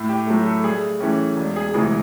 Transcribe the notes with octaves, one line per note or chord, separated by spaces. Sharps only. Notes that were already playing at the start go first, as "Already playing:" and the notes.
Already playing: A2
G4
F#3 A3
A4
G2 G#4
E3 A3 C#4 G4
E1
G#4
D2 C3 E3 G#3 G#4